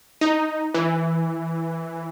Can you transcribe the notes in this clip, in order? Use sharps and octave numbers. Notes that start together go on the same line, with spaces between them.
D#4
E3